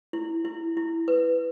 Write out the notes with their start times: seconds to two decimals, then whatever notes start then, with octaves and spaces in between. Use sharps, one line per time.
0.13 E4
0.45 E4
0.77 E4
1.08 B4